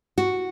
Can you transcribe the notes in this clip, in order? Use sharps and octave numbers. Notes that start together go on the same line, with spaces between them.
F#4